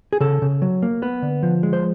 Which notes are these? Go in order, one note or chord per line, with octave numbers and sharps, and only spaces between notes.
G#4
C#3 A4
C#3
F#3
A#3
B3 B4
D3
F3
G#3
C5